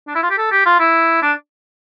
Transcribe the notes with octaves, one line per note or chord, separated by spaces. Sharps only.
D4
E4
F4
G4
A4
G4
F4
E4
D4